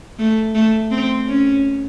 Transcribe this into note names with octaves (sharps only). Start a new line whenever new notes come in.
A3
A3
C4
C#4